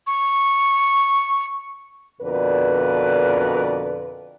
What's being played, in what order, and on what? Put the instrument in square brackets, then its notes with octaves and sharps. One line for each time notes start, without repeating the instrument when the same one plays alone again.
[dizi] C#6
[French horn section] F2 B2 D3 A#4 B4 D5